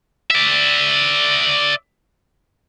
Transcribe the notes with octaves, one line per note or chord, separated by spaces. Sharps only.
D5 E5